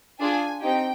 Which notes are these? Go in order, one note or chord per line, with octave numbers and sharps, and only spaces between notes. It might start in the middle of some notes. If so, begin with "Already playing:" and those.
D4 F4 G#4 G#5
C4 D#4 G4 G5